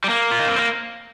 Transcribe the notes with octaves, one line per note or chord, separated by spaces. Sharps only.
G3
A#3
F4
D#4
C4
A#3